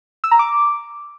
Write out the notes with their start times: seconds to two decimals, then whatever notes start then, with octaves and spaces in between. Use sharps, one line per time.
0.24 E6
0.31 A#5
0.39 D6